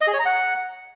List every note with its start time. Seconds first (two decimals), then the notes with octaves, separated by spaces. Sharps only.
0.01 D#5
0.07 G#4
0.13 C#5
0.19 A#5
0.25 F#5